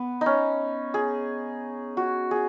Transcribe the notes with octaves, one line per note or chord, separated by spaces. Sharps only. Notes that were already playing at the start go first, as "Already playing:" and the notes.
Already playing: B3
C#4 D#4
G#4
F#4
G#4